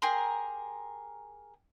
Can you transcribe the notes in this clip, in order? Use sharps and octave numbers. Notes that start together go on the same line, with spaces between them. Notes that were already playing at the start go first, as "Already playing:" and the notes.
G4 G#4 A#4 C6